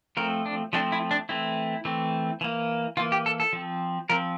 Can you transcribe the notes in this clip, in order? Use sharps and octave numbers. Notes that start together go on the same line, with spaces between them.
F3 A3 C4 A#4
D4
F3 A3 C4 D4
E4
D4
E3 A3 C4 E4
E3 A3 C4
E3 A#3
E3 A#3 F4
G4
A4
A4
F3 C4
F3 C4 A#4